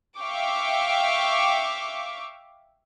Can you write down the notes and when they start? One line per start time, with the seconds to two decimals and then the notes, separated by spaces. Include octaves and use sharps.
0.18 E5 F5 G5 C#6 D6